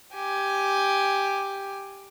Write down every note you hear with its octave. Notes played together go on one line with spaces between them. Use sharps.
G4 G#5